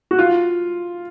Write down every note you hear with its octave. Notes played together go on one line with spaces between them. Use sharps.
F#4
F4